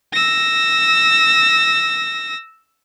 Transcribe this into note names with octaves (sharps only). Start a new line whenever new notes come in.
E6 A#6